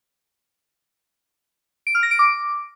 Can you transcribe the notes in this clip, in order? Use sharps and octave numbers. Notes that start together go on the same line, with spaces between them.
D7
F6
A#6
D7
D6